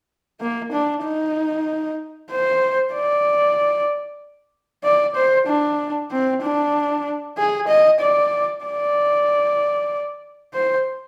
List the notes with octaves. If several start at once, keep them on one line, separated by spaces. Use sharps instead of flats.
A#3
D4
D#4
C5
D5
D5
C5
D4
C4
D4
G#4
D#5
D5
D5
C5